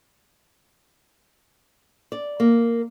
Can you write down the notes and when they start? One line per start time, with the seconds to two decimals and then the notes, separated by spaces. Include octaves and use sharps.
2.12 D5
2.40 A#3